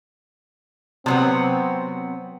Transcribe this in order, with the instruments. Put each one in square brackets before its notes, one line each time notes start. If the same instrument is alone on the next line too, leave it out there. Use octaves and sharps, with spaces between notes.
[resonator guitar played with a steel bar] C3 F#3 B3 [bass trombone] C4